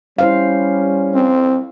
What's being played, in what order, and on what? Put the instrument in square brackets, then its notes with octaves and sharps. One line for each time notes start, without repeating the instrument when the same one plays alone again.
[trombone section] G3 C#4 [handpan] E4 C5 F5
[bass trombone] C4